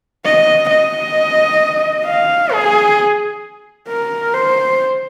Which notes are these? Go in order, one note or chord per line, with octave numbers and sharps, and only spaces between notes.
D#5
D#5
F5
G#4
A#4
C5